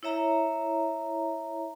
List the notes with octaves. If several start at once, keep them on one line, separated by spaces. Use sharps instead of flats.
E4 C#5 E5 A#5